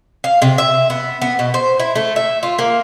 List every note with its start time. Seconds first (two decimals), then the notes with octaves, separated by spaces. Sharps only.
0.24 F5
0.42 C3
0.58 E5
0.90 B3
1.22 B3
1.39 B2
1.54 C5
1.80 E4
1.95 A3
2.16 E5
2.43 F4
2.59 A#3